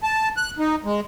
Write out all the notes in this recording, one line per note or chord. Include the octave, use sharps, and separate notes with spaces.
A5
F#6
D#4
G#3